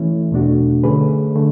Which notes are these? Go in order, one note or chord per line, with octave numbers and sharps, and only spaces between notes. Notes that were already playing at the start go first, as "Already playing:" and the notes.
Already playing: E3 A3 C#4 E4
E2 B2 A3 D4 F#4
D3 A3 C#4 G#4 B4
D3 A3